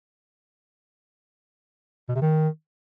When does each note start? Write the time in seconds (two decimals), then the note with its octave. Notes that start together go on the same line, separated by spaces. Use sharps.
2.09 B2
2.15 C3
2.22 D#3